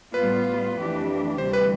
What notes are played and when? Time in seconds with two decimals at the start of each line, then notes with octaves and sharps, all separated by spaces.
0.14 A2 G3 B3 F4 B4
0.76 F2 E3 A3 D4 G4
1.38 D2 C3 E3 G3 C5
1.53 B4